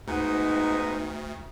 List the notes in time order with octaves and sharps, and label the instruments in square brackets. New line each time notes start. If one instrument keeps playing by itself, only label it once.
[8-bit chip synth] D2 [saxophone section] G#2 B3 D#4